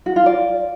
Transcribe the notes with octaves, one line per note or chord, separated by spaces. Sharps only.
F#4
F4
D5